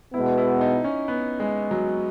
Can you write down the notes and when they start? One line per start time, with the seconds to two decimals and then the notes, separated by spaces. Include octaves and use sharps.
0.14 B2 G#3 B3 E4
0.38 E4
0.61 D#4
0.84 C#4
1.08 B3
1.40 G#3
1.71 F#3